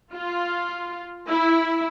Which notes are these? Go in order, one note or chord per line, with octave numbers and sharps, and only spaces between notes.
F4
E4